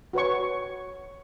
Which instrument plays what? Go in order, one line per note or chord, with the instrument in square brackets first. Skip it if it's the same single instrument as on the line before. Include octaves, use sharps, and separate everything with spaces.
[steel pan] F#4 B4 C#5 C#6